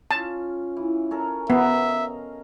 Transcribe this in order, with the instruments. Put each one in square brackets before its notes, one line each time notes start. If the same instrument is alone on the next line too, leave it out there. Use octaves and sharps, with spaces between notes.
[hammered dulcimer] C#4 F4 [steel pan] A5
[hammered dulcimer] E3
C#4 A4 A#4
[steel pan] B3 [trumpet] E5 [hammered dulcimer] F5 A#5
[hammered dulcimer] D#5